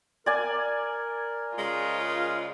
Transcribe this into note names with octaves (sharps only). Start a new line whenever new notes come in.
A#4 D5 G#5
C#3 G#3 F4